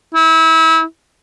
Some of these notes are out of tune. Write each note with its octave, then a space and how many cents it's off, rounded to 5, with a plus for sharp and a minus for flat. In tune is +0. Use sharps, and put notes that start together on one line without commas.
E4 -30